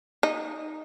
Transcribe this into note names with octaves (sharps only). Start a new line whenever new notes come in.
D#4